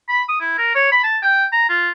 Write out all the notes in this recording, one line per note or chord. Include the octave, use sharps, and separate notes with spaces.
B5
D#6
E4
A#4
C#5
B5
A5
G5
A#5
F4